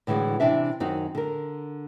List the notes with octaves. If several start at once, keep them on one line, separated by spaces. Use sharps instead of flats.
A2 D3 E3 G#3 F#4
C3 E3 D4 E5
F#2 D#3 C4 D#4 F#4
D3 A#4